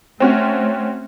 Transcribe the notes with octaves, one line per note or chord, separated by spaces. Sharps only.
A3 C4 C#4 F#4